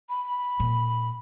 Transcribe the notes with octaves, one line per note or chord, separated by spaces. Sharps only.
B5
A#2